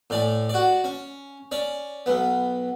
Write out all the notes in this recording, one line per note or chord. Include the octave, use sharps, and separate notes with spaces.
A2 D5 G#5
F#4 D5
C#4
C#4 D5
B1 B3